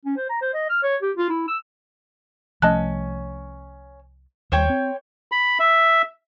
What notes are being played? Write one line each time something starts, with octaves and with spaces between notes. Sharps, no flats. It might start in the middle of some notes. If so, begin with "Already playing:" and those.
C#4
C5
A#5
C5
D#5
F6
C#5
G4
F4
E4
E6
C2 F3 A3 C#4 D#5 A5 F#6
D#2 G3 C5 C#5 G5
C4
B5
E5